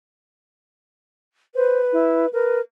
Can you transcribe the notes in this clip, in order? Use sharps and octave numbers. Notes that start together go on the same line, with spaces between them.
B4 C5
E4
A#4 B4